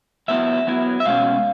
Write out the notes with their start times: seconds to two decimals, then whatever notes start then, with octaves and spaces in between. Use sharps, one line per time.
0.28 F#3 B3 E4 E5
0.67 F#3 B3 E4
1.00 E5
1.06 B2 G#3 C#4 F5